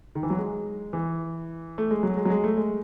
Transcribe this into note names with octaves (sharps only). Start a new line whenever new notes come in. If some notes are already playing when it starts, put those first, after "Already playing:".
D#3
E3
F#3
G#3
E3
A3
G#3
F#3
G#3
F#3
G#3
A3
G#3